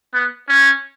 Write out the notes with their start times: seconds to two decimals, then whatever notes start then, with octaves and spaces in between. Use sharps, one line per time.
0.13 B3
0.48 C#4